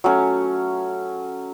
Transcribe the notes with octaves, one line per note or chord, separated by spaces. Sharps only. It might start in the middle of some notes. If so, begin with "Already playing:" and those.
F#3 A3 C#4